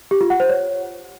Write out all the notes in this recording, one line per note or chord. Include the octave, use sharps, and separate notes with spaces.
G4
F4
F#5
C5
C#5